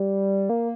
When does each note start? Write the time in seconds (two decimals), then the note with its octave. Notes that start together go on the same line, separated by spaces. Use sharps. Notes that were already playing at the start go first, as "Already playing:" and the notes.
Already playing: G3
0.49 A#3